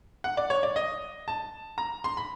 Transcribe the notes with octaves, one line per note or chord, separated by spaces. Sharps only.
F#5
D5
C#5
D5
D#5
A5
A#5
C6
B5